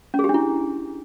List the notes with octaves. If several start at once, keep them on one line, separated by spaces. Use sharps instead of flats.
C#4
G#4
G4
D4
E4